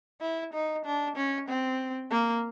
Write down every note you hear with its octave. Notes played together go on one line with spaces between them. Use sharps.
E4
D#4
D4
C#4
C4
A#3